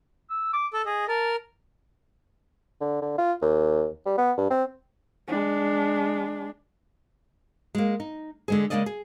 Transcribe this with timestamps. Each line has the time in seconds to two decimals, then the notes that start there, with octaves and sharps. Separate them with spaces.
0.30 E6
0.53 D6
0.74 A4 E6
0.86 G#4 D#5
1.08 A#4 A5
2.81 D3
3.02 D3
3.18 F4
3.41 D#2
4.06 G3
4.18 B3
4.38 G2
4.50 C4
5.28 G#3 D4
7.75 G#3 A#3
8.00 D#4
8.48 D3 G#3 G#4
8.70 C#3 F#3 G#3 A#3 D5 D#5
8.86 G#4